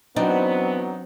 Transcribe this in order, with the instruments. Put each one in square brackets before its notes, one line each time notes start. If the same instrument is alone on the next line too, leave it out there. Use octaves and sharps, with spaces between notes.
[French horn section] E3 B3 [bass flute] F#3 [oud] C4 [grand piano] D4 D#4